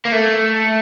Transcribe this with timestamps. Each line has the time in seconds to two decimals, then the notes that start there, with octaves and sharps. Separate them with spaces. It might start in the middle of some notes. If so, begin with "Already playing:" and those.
0.05 A#3
0.12 A3